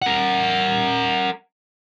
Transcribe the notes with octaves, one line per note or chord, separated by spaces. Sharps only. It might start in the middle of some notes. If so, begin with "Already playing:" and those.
A#4 F#5